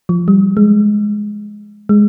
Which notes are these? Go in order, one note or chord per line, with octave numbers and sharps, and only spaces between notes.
F3
G3
G#3
G#3